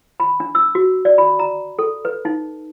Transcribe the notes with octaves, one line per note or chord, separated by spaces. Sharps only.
B5
D4
E6
F#4
D5
B5
A#5
A4
B4
D#4